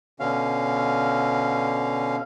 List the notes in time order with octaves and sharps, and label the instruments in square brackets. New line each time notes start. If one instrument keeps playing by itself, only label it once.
[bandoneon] B2 D3 C#4 F5